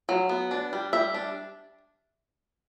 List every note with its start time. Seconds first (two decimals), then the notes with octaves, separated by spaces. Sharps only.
0.09 F#3
0.29 B3
0.51 D4
0.73 G3
0.93 G3 E5
1.14 D4